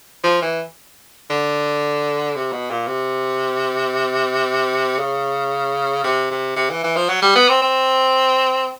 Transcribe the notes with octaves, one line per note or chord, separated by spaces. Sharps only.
F3
E3
D3
C3
B2
A#2
C3
C#3
C3
C3
C3
E3
E3
F3
F#3
G3
B3
C4
C4